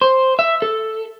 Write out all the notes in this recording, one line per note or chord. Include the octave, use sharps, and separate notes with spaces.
C5
E5
A4